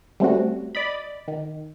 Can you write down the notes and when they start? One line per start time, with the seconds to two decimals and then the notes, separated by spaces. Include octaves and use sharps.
0.20 G3 A3 C4 C#4 F#4
0.75 D5 D#5 B5
1.28 D#3